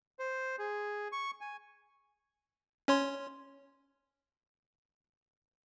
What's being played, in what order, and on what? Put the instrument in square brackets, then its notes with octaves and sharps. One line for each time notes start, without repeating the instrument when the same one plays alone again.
[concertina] C5
G#4
C#6
G#5
[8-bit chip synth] C#4 C#5 C6